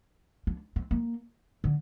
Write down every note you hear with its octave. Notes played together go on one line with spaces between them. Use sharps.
D4
C4
A#3
D3